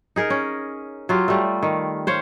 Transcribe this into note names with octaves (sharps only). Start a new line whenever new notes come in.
D#4 G#4 A#4
C#4
F#3 F4 G4
G3 A3
D#3
C5 C#5 F5